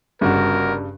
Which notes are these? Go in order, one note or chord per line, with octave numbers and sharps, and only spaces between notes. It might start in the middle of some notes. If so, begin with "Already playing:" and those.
G1 G2 C#3 F#4 A#4